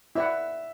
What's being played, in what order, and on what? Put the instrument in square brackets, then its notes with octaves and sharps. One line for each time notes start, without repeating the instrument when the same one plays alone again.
[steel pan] E4 D5 F#5 [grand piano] E5